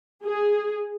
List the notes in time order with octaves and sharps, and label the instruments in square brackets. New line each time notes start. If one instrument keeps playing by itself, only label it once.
[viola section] G#4